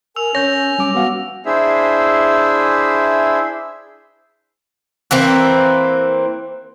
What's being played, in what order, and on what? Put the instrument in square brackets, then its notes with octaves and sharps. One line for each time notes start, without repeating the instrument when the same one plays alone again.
[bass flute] A#4 [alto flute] G#5 [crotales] E6 F7
[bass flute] C#4 [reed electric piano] C#5 G6 [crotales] A#6
[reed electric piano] G3 D6 [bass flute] C#4
[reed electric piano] B3 F5 [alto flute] F#4 [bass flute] F#5
[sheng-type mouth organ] D4 E4 G#4 C5 E5
[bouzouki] E3 A#3 C4